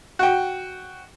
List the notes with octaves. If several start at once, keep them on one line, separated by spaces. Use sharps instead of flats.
F#4 G5